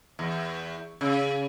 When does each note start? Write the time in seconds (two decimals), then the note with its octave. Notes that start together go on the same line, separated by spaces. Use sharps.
0.19 E2
1.01 C#3